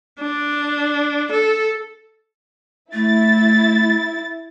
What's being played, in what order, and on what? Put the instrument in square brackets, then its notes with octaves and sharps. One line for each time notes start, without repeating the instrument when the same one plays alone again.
[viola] D4
A4
[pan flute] A3 [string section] E4 A6